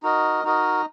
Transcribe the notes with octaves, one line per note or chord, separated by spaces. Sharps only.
D#4 F#4 A#4 D#5
D#4 F#4 A#4 D#5